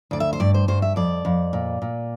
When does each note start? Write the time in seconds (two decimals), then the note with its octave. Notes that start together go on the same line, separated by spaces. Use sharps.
0.11 D2 D5
0.20 E5
0.33 C5
0.40 G2 D5
0.54 C5
0.68 G2 C5
0.82 E5
0.96 F2 D5
1.25 F2
1.53 A#2
1.82 A#2